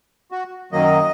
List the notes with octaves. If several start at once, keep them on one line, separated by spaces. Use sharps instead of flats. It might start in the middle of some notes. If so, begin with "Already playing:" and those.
F#4
F#2 D#3 F#3 A#3 D#5